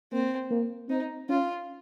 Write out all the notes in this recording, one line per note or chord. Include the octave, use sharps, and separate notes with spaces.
A#3 C4
A#3
C4 D#4
C#4 F4